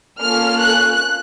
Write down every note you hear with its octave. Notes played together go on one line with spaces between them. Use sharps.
A#3 C#4 F4 A4 F6
F#6